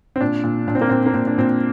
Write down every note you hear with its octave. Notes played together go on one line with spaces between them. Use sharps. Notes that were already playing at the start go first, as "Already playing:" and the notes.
C4
A#2 D4
A#2
A#2 D4
C4
A#3
A#2 C4
A#3
A#2 C4
D4
A#2 C4